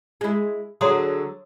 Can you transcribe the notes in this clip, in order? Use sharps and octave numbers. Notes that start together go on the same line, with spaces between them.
G#3 E4
D3 F#3 G#4 C#5 C6 D#6